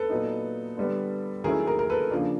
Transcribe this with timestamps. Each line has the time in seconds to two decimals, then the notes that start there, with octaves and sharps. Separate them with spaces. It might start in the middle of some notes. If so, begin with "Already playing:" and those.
Already playing: A4 B4
0.10 A#2 F#3 B3 D#4
0.77 D3 G3 B3
1.44 D#3 F#3 A3 C#4 E4 G#4 A#4
1.67 G#4 A#4
1.79 A#4
1.90 A4 B4
2.11 C#3 F3 A#3 D4